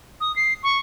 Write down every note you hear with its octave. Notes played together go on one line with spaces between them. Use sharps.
D#6
C7
C#6